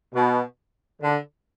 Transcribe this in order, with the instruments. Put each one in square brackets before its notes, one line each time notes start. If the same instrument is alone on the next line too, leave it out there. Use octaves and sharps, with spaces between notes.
[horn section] B2
D3